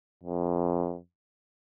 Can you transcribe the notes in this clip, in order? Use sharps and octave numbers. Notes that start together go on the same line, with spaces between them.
F2